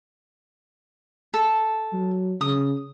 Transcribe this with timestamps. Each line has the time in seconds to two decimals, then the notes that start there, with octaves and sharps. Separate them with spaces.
1.34 A4
1.93 F#3
2.41 C#3 D#6